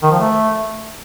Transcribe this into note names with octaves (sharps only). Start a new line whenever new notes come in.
D#3
F3
A3